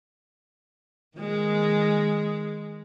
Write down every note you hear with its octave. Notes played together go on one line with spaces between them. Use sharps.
D#3 G#3